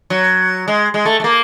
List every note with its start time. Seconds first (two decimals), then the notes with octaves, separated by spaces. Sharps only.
0.10 F#3
0.68 G#3
0.94 G#3
1.05 A3
1.20 A3
1.24 A#3